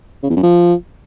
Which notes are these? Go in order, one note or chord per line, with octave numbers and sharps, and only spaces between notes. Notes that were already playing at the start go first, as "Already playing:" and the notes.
C#3
E2
F#2
F3